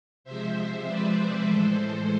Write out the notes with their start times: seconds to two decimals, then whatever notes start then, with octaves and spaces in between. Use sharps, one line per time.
0.24 C3 F3 G#3 C5 E5
0.85 B4 D5
1.46 A2 E3 G#3 A4 C5